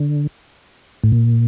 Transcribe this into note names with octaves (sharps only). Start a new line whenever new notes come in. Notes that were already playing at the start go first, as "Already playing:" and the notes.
Already playing: D3
A2
A#2